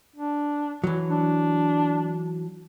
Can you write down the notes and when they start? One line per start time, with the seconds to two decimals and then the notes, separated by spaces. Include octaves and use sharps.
0.16 D4
0.84 E3 F#3
1.10 D4